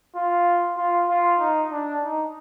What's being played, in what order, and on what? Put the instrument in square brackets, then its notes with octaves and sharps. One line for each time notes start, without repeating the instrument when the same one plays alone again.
[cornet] F4
F4
F4
D#4
D4
D#4